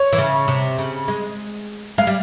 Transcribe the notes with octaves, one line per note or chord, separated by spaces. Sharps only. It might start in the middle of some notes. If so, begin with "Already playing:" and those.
Already playing: C#5
E3
C#3
C3
C#3
G#3
G#3 F5
G3